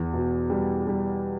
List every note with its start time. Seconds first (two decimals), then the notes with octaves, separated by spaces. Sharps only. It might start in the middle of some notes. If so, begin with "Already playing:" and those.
Already playing: E2
0.14 B2
0.50 G3
0.87 G3